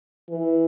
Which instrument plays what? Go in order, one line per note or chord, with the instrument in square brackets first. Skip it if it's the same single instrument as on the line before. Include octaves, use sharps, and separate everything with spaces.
[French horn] E3